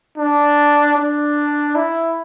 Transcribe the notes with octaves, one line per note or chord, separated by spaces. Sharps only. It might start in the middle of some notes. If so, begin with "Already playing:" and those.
D4
D4
E4